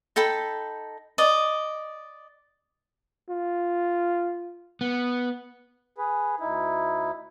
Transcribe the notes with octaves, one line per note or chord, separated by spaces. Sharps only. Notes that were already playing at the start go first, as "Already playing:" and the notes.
D#4 A4 G5 B5
D5 D#5
F4
B3
G#4 B4
D2 D#4 E4